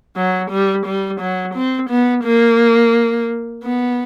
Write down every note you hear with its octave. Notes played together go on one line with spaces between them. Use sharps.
F#3
G3
G3
F#3
C4
B3
A#3
B3